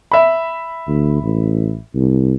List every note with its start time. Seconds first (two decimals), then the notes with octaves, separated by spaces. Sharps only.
0.12 E5 B5
0.88 D2
1.22 A1
1.95 C2